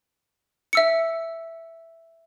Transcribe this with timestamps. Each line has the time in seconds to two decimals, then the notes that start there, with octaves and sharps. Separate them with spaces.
0.73 E5 E6 C#7